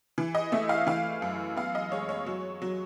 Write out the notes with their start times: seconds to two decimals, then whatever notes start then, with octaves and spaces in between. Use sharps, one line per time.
0.18 E3
0.35 D#5
0.52 A3 E5
0.69 F5
0.87 E3 F5
1.22 F#2
1.57 B3 F5
1.75 D#5
1.92 G#3 C#5
2.09 C#5
2.26 F#3
2.62 F#3